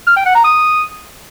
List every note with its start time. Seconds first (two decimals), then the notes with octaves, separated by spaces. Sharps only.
0.07 F6
0.16 G5
0.26 F#5
0.35 A#5
0.44 D#6